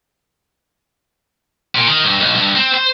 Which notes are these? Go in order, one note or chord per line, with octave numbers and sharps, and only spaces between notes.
A#2
D#3
G2
B1
G2
C4
C5